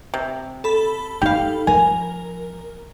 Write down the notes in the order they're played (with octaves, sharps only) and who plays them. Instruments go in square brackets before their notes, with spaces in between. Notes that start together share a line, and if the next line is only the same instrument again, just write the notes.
[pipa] C3
[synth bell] A4 B5
[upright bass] D#4 [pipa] G4 F5
[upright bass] F3 [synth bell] A#4 [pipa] G#5